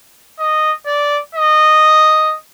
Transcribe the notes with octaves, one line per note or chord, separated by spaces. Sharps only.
D#5
D5
D#5